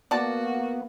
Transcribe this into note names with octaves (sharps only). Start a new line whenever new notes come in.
A#3 B3 F#4 D5 A5